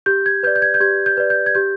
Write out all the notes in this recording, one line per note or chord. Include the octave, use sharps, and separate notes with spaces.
G4 G6
G#6
B4 D5 G6
G6
G#6
G6
G4 G#6
G6
B4 D5
G6
G#6
G4 G6